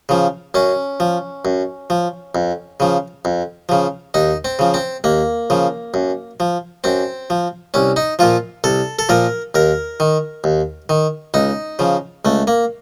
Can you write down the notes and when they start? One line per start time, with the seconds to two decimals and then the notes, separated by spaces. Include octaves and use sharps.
0.09 C#3 F3
0.54 F#2 C#4
1.00 F3
1.45 F#2
1.90 F3
2.35 F2
2.80 C#3 F3
3.25 F2
3.69 C#3 F3
4.14 D#2 D#4
4.45 C4
4.59 C#3 F3
4.74 C4
5.04 D#2 A#3
5.50 C#3 F3
5.94 F#2
6.40 F3
6.84 F#2 C4
7.30 F3
7.74 C2 C#4
7.96 D#4
8.19 A#2 F3 F4
8.64 C2 A4
8.99 A4
9.09 A#2 F3 A#4
9.55 D#2 A#4
10.00 D#3
10.44 D#2
10.89 D#3
11.34 C#2 D#4
11.79 C#3 F3
12.25 C#2 A3
12.47 A#3